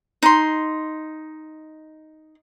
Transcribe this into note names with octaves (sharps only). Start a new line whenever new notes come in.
D#4 C6